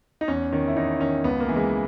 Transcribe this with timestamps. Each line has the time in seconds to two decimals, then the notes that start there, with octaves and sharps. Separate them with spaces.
0.21 D#4
0.28 E2 C#4
0.53 D#3 C#4
0.68 E4
0.76 E2 D#4
1.00 D#3 C#4
1.24 C#2 B3
1.40 A#3
1.48 C#3 E3
1.56 G#3